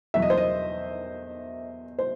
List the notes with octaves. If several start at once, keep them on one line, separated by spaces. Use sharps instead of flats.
E2 B2 F#3 E5
D#5
C5
D#5
C5